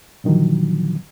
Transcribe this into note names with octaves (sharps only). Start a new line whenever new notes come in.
A#2 D3 D#3 F3 F#3